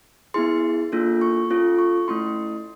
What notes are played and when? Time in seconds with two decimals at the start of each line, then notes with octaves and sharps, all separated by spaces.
0.34 B3 E4 G#4 C6
0.92 A#3 D4 F4 A4
1.21 C#6
1.50 C#4 F4 A4
1.78 C#6
2.08 A3 C#4 E4 C6